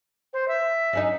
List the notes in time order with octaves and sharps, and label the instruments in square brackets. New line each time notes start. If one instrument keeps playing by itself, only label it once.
[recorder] C5
E5
[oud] F#3 C#4 D#4